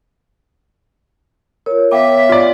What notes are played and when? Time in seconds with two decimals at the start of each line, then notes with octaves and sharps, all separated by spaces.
1.66 F4 A#4 C#5
1.92 B3 C#5 E5 F5 G5 D6
2.29 F4 D5